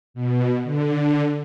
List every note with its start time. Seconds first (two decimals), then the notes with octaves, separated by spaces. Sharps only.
0.14 B2
0.64 D3